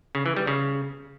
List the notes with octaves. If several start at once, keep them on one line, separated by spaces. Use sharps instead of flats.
C#3
E3
G3
C#3